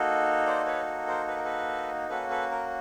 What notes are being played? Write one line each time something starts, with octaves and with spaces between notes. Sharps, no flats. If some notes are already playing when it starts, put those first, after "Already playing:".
Already playing: A#3 D#4 F#4 A4
C5 D5
B4 C#5
A#4 C5
B4
A#4
A4 B4
A#3 C#4 F#4 A4 B4
A4 B4
A#4